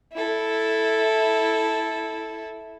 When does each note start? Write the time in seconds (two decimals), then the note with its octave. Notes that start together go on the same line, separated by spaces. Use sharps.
0.13 E4 A4